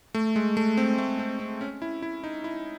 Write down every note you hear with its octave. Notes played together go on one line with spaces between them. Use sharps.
A3
G#3
A3
C4
A3
C4
C4
C#4
E4
E4
D#4
E4